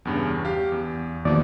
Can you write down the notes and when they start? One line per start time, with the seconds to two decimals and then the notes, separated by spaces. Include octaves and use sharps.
0.05 E2 G2 C#3
0.45 G4 F5
0.72 E2
1.25 D#2 B2 F3 D5